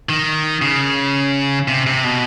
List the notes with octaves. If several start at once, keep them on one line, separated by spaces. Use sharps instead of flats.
D#3
C#3
C3
C3
B2